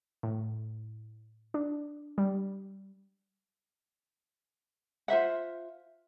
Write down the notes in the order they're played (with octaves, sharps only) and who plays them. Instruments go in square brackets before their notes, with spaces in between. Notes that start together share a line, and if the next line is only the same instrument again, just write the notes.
[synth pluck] A2
D4
G3
[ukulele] F4 C5 E5 F#5